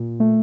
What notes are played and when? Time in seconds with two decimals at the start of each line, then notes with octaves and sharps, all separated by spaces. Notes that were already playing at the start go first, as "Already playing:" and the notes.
Already playing: A#2
0.20 A3